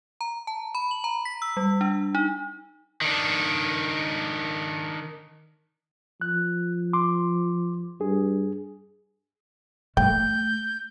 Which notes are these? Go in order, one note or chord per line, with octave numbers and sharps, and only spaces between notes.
A#5
A5
B5
F#7
A#5
B6
E6
G3
D4
D#4
D#3 D4
F3 F#6
C6 D6
G2 G#4
A3 G5 G6